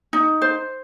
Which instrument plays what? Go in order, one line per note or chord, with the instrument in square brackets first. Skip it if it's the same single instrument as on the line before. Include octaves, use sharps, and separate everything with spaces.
[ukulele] D#4
C5